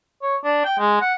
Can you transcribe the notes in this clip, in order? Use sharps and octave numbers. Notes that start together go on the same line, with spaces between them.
C#5
D4
G5
G#3
F#5